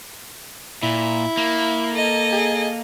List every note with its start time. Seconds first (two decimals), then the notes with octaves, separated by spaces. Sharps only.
0.83 A#2 E4
1.37 A#3
1.92 A4 D#5
2.32 G#4